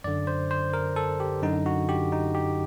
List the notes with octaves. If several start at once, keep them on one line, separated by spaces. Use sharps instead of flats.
F#2 D3 D5
C5
C5
A#4
A4
G4
F#2 D3 D#4
F#4
G4
D#4
G4